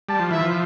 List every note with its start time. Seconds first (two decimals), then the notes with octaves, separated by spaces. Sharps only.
0.09 G3 A5
0.19 F3
0.31 E3 E5
0.41 F3